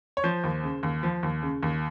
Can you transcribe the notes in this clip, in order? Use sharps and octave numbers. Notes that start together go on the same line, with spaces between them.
C#5
F3 C5
D#2
C#3
D#2
F3
D#2
C#3
D#2